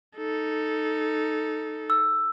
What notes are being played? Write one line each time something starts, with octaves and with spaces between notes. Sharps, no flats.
D#4 A4
E6